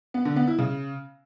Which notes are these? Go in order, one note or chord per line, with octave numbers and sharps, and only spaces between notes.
B3
D3
B3
E4
C#3